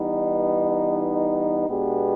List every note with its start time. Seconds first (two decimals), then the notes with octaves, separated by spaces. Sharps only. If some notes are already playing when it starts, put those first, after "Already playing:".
Already playing: E3 G3 B3 D#4
1.68 B2 G#3 B3 D4 G4